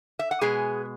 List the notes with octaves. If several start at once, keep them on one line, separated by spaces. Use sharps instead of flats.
E5
F#5
B2 G#3 B3 G#4 G#5